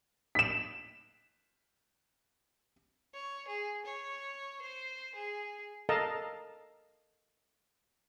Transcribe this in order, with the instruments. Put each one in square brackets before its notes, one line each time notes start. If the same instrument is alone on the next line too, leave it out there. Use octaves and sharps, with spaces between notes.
[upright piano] B6 E7
[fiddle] C#5
G#4
C#5
C5
G#4
[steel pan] A4 A#4 D#5 F5 A5 A#5